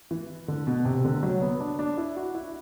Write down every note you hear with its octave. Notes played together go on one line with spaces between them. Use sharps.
E3
D3
B2
C3
D3
F#3
B3
D4
D4
E4
F#4
E4